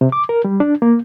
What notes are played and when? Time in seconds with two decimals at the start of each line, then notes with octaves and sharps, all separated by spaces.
0.01 C3
0.12 D6
0.29 A#4
0.44 G3
0.60 D4
0.82 A#3